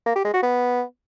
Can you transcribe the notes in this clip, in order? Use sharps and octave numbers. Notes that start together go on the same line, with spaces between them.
A#3
G4
G#3
F#4
B3